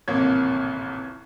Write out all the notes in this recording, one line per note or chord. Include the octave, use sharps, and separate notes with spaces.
D#1 A1 C3 A#3 C#5